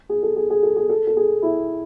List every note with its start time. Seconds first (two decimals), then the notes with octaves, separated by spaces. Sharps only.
0.09 G#4
0.23 A4
0.36 G#4
0.50 G#4
0.63 A4
0.76 G#4
0.90 A4
1.07 A4
1.17 G#4
1.42 E4